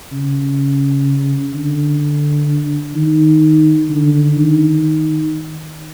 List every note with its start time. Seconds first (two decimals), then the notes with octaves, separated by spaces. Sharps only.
0.12 C#3
1.54 D3
2.95 D#3
3.90 D3
4.37 D#3